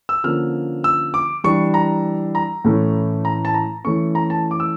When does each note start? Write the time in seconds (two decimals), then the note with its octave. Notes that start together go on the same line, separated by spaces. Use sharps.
0.09 E6
0.24 D3 F3 A#3 C#4 F6
0.84 E6
1.14 D6
1.44 E3 G3 D4 C#6
1.74 A#5
2.35 A#5
2.65 A2 E3 A3 C#4
3.25 A#5
3.45 A5
3.54 A#5
3.85 E3 A3 C#4 C#6
4.15 A#5
4.30 A5
4.51 D6
4.60 E6